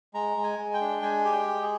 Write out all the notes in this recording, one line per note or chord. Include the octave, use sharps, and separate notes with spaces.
G#3 A#5
G#3
G#5
G#3
G5
D4
G#3 G#5
G4
G5
G#3
G#4